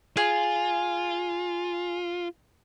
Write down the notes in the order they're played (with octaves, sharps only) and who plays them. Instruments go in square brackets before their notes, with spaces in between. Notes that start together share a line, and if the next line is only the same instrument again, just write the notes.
[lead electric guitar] F4 [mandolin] G#4